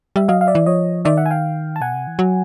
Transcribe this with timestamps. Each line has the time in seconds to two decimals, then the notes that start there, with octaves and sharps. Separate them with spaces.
0.16 G3 E5
0.28 F#3 D#5 F5
0.41 F5
0.47 D5 E5
0.55 E3
0.66 F3 C#5 D#5
1.05 D#3 D5 E5
1.17 E5 F#5
1.26 G#5
1.30 F5 G5
1.76 A5
1.81 B2 F#5 G#5
1.94 C3
2.07 E3
2.19 F#3